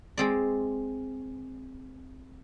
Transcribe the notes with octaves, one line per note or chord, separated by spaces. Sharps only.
G#3 C4 D5